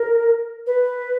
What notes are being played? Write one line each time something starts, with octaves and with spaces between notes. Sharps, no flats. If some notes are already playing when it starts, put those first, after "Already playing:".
Already playing: A#4
B4